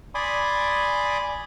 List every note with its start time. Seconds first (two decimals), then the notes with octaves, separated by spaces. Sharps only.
0.15 D5 G#5 B5 C6 D6 D#6